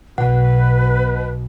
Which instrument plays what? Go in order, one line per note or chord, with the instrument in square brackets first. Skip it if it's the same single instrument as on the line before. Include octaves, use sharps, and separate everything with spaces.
[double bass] B1 [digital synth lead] B2 [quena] B4 [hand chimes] F#5